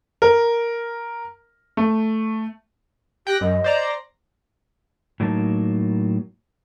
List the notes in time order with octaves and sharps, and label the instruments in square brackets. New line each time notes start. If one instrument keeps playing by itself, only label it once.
[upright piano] A#4
A3
[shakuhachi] G4 [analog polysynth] G5 F#6 A#6
[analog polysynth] F#2 [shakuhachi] D#5
[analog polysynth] C5 D5 A#5
[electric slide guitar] A2 F#3 A#3 D#4 D#5 A5